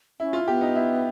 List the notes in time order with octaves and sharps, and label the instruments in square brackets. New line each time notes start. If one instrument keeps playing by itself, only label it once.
[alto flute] C#4 [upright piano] E4
[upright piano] F4
[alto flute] B3 [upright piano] G4
[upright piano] D#4
E4